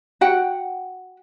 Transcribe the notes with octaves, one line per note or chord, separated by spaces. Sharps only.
F#4 F#5 G5